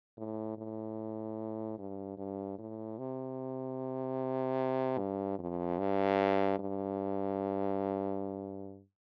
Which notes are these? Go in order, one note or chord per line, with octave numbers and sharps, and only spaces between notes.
A2
A2
G2
G2
A2
C3
G2
F2
G2
G2